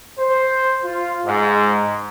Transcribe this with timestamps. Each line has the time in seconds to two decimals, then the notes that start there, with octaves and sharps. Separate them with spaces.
0.18 C5
0.83 F4
1.25 G#2